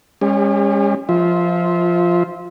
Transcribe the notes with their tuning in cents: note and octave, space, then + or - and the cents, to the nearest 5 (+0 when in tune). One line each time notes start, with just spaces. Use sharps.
G#3 -40 C#4 -10 G4 +40
F3 +0 F4 -5 E5 -35